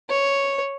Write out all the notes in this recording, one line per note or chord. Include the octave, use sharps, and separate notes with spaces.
C#5